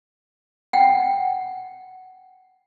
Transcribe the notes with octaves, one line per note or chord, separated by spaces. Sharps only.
F#5 G5